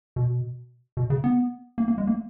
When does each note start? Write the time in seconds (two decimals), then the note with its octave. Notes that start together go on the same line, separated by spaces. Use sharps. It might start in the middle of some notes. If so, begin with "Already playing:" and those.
0.16 B2
0.97 B2
1.10 C#3
1.24 B3
1.78 A#3
1.88 A#3
1.98 G#3
2.07 A#3